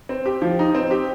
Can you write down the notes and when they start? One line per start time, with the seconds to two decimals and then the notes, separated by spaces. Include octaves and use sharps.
0.09 C4
0.26 G4
0.42 F3
0.59 D#4
0.75 C4
0.91 G4